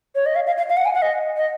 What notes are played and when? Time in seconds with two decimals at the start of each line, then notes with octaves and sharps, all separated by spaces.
0.15 C#5
0.26 D#5
0.35 F5
0.47 F5
0.58 F5
0.69 F5
0.77 F#5
0.85 G#5
0.94 F#5
1.02 D#5
1.37 D#5